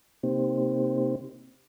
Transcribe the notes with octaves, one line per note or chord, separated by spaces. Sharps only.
C3 A#3 C4 D#4 G4 C5